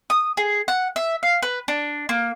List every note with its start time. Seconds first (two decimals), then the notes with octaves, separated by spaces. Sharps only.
0.10 D#6
0.37 G#4
0.68 F#5
0.96 E5
1.23 F5
1.42 B4
1.68 D4
2.09 A#3